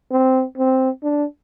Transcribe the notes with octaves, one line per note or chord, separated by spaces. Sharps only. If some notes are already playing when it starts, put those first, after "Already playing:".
C4
C4
D4